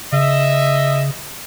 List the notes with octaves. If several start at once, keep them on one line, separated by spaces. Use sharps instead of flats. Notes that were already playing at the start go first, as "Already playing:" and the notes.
C#3 D#5 E5